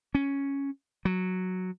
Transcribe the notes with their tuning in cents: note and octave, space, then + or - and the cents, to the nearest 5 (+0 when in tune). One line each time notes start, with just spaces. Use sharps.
C#4 +0
F#3 -5